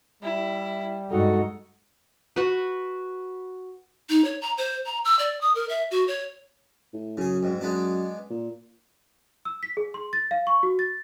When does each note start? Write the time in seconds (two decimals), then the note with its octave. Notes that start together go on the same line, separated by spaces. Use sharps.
0.23 G3 E4
1.10 G2 G#3 D#4 F#4 A4 F#5
2.36 F#4 B4
4.09 D#4
4.24 C#5
4.42 A#5
4.58 C5
4.86 A#5
5.05 E6
5.19 D5
5.41 D#6
5.55 A#4
5.69 E5
5.91 F#4
6.08 C#5
6.93 A2
7.17 F#2 C#3 G#4
7.43 F2 G#2
7.61 F#2 G#3 B3 D4
8.30 A#2
9.45 E6
9.63 B6
9.77 G#4
9.94 C6
10.13 A6
10.31 F5
10.47 C#6
10.63 F#4
10.79 A6